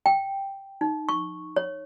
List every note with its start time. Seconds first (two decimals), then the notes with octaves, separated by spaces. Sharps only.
0.06 G5
0.81 D#4
1.09 C#6
1.56 C#5